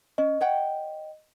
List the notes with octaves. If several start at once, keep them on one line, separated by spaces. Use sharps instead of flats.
C#4 D#5
C#5 F#5 G5